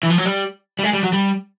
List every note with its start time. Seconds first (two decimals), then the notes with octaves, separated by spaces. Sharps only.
0.03 E3
0.10 F3
0.18 F#3
0.25 G3
0.79 G3
0.83 G#3
0.93 G3
1.03 F#3
1.13 G3